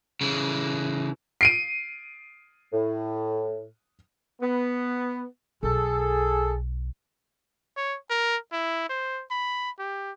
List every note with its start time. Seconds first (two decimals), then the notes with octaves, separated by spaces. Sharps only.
0.21 C#3 E3
1.41 C7 D7 D#7
2.73 A2
4.41 B3
5.63 B1 G#4 A4
7.77 C#5
8.10 A#4
8.52 E4
8.89 C5
9.31 B5
9.79 G4